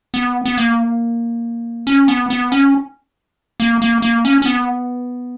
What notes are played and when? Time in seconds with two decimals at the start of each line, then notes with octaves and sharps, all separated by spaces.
0.14 B3
0.46 B3
0.58 A#3
1.87 C#4
2.08 B3
2.30 B3
2.52 C#4
3.60 A#3
3.82 A#3
4.02 A#3
4.25 C#4
4.42 C#4
4.46 B3